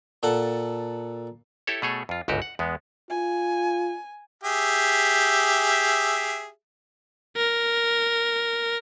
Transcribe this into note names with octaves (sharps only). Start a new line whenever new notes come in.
A#2 A4 F#5 A5
E4 G4 A4 C#5
B2 A3 G#4 A4 C#5
F2 F4
G1 C#2 G#2 F#4 G4
F#5
E2 G#3 B3
F4 G#5
G4 G#4 E5
A#4